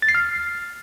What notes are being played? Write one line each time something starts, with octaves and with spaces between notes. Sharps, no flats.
A6
C7
F6